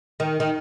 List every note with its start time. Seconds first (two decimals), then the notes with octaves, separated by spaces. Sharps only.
0.20 D#3
0.40 D#3